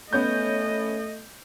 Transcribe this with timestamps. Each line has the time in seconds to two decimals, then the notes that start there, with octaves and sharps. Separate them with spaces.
0.13 A3 B3 C#4 D#5 G6